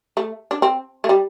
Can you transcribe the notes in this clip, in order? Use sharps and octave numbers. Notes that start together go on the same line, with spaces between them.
A3
D4
C4
A3
G3